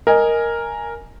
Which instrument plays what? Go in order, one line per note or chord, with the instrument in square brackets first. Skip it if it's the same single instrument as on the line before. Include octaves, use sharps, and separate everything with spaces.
[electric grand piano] A#4 [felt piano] D#5 G#5